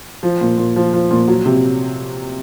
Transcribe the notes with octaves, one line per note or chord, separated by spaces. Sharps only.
F3
A#2
A#2
F3
F3
A#2
F#3
C3